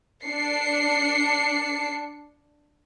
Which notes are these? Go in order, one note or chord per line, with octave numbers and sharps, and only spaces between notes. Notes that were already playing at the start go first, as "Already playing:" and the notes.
D4 C7 C#7